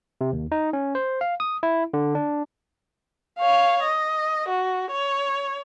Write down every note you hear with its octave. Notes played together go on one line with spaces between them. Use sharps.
C3
D#2
D#4
C#4
C5
F5
D#6
E4
D3
D4
C#5 F5
D#5
F#4
C#5